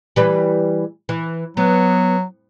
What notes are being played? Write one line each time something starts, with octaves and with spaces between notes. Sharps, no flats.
E3 G3 B4
E3
F#3 B3